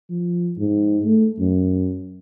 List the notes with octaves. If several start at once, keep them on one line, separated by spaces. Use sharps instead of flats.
F3
G#2
A3
F#2